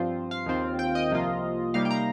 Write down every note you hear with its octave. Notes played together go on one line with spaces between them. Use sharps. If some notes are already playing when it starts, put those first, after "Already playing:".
Already playing: G2 F3 C4 F4 C5
F5
D#2 D#3 C4 F4
G5
D#5
C2 C3 F3 A#3 F4
C3 G3 A#3 D#4 F5
G5
A#5